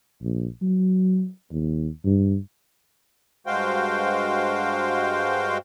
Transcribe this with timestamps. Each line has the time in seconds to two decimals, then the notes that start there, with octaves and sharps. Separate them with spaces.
0.23 A#1
0.62 F#3
1.52 D#2
2.05 G2
3.47 G2 G#3 F#4 C5 F5 G5